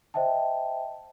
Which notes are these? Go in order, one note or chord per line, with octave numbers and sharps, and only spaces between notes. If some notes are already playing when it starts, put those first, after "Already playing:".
C5 D#5 E5 G5 A5